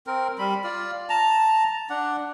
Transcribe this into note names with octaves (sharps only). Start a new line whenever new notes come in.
C4 A#4
G3 B5
F4 D5
A5 A#5
D4 F#5